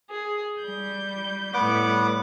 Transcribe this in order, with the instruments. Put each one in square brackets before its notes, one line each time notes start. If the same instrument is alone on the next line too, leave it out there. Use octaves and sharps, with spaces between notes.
[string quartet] G#4
G3 G6
[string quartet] A2 G3 [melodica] B3 F#5 D6